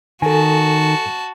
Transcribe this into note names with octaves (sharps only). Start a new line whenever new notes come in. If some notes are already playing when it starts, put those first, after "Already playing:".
D#3 F#4 A4 G#5 A5